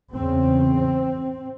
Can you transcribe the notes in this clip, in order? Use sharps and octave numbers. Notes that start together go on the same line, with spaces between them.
E2 C#3 C4